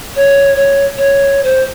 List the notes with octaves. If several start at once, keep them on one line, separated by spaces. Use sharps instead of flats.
C#5
C#5
C#5
C5